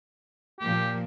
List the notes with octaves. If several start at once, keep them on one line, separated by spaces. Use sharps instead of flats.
A#2 F3 A#3 G4